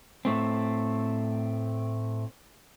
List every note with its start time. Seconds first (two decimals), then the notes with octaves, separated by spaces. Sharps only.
0.25 A2 A3 C4